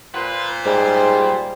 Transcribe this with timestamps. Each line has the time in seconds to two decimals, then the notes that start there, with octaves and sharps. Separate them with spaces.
0.15 A#2 B4 C5
0.65 G#2 G3